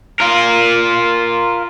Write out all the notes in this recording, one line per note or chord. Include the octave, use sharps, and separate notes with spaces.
F4 A#4